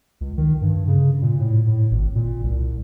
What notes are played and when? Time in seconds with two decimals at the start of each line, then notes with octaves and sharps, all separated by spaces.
0.21 C#2
0.37 D#3
0.61 G2
0.88 C#3
1.22 A#2
1.40 A2
1.67 A2
1.91 G#1
2.15 A#2
2.44 C2